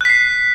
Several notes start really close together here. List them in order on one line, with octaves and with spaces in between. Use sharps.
F#6 B6 C7